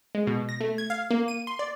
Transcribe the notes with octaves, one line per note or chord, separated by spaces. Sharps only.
G#3
B2
A#6
A3
G#6
F5
A#3
D#7
C6
D5